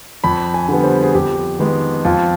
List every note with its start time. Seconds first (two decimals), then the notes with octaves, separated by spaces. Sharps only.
0.24 F2 B5
0.54 G#5
0.69 D3 G3 B3
0.84 C5
1.03 G#4
1.15 F2 G4
1.59 D#3 G#3 B3
2.05 F2 F4